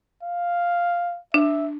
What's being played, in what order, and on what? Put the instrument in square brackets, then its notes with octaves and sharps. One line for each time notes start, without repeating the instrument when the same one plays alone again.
[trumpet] F5
[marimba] D4 [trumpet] E5